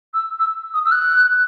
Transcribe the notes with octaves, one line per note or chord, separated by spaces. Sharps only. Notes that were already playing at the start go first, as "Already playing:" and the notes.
E6
E6
D#6
E6
F#6